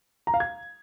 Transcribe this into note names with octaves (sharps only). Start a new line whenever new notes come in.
A#5
F5
G#6